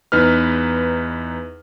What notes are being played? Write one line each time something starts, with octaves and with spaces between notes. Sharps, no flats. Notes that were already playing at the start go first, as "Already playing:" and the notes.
E2 D#4 B4 F6